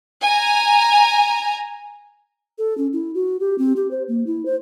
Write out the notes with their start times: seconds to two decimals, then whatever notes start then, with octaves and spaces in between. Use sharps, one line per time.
0.23 G#5 A#5
2.58 A4
2.78 C#4
2.93 E4
3.15 F#4
3.40 G4
3.58 C4
3.76 G4
3.91 C5
4.08 A#3
4.27 E4
4.46 C5